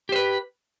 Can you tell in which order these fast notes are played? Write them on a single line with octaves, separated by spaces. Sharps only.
G4 C5 B4